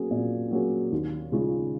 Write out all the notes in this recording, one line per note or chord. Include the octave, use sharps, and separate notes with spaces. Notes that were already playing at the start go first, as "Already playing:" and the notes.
Already playing: F#3 A#3 C#4 G#4
A#2
F#3 A#3 C#4 G#4
D#2
C#3 G#3 C#4 F4